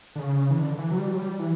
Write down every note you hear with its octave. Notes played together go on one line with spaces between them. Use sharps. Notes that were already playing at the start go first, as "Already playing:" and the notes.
D3
C#3
E3
D3
E3
F#3
G3
F#3
G3
E3